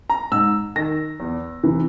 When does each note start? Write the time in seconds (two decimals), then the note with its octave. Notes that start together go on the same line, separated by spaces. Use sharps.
0.10 A#5
0.31 G#2 E6
0.76 D#3 A#6
1.20 E2
1.63 C3 E3